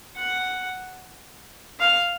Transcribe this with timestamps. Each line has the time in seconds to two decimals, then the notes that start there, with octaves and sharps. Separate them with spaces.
0.16 F#5
1.80 F5